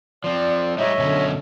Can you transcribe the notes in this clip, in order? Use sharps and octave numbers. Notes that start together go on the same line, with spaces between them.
F3 C4 D5
G3 G#3 D#4 C#5 D#5 E5
F#2 B2 D3 C#4